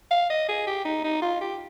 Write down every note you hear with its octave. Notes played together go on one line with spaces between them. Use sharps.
F5
D#5
G#4
G4
D#4
D#4
F4
G4